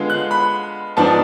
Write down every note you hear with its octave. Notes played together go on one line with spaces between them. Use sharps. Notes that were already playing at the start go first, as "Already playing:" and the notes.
Already playing: D3 G#3 B3 F4
F#6
B5
G#2 F3 B3 D4 A5